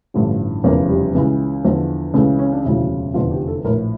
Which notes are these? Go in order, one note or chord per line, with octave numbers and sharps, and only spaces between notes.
A1 G2 D3 F3 A3
F1 E2 C#3 F3 A#3
G3
C#2 C#3 E3
E2 D3 F3
C#2 C#3 E3 A3
C#4
D4
E1 D2 C#3 F3 E4
F1 E2 D3 F3 F4
G4
A4
A#1 A2 F3 A#4